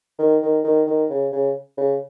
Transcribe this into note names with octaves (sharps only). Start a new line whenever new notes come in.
D#3
D#3
D#3
D#3
C#3
C#3
C#3